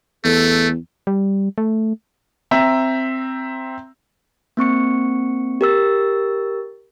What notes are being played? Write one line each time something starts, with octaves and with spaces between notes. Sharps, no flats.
E2 A3 A4
G3
A3
C4 E5 A#5
A#3 C4 C#6 C#7
G4 A#4 E6 A6